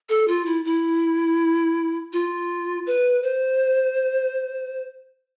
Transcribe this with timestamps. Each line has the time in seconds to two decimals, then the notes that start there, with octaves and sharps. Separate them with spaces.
0.09 A4
0.28 F4
0.46 E4
0.65 E4
2.13 F4
2.87 B4
3.23 C5